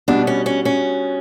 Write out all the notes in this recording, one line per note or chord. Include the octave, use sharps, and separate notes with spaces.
B2 G3 B3 D4
C#4
C#4
C#4